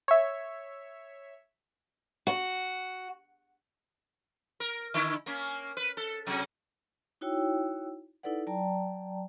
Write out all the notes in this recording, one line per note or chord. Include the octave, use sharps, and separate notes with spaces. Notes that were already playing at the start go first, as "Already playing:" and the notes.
C#5 E5
F#4
A#4
D3 E4
A#3 C#4
B4
A4
C3 F#3
D#4 E4 F#4 C#5 G5 E6
D#4 E4 A4 B4 D5 F#5
F#3 D5 G5 A5 A#5